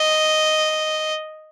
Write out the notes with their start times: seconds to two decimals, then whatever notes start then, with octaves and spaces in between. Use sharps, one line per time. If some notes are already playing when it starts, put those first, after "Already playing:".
Already playing: D#5